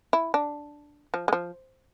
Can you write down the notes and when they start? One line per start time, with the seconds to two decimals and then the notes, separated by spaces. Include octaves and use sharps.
0.13 E4
0.34 D4
1.14 F3
1.28 G#3
1.33 F3